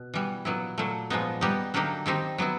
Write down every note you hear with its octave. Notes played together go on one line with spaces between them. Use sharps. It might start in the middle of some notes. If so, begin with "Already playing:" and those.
Already playing: B2
E3 G3 B3
A#2 F#3 B3 E4
A#2 F#3 A3
A#2 F3 G#3 B3 D#4
G3 B3 D#4 G4
D3 F#3 A#3 D#4 G4
D#3 G3 C4 D#4 G4
F#3 B3 E4